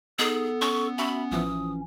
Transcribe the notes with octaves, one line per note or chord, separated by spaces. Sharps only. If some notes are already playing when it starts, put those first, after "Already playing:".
B3 D#4 G#4 A4
C#4 C#6
C#4 F#4 E5 B5
A1 E3 F3 D#6